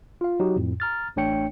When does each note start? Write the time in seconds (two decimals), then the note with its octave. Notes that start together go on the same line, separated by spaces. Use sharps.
0.21 F4 F5
0.40 F#3 D#4 F#4 G4
0.56 F2 A2
0.80 A#5 F6 A6
1.16 A1 A3 D4 C#5 G5 C#7